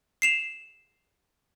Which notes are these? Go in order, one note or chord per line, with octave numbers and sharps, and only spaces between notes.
C7 E7 F7